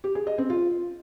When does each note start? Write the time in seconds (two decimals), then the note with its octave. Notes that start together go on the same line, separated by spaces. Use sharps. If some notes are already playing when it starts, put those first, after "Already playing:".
0.04 G4
0.15 G#4
0.27 D#5
0.38 C4
0.50 F4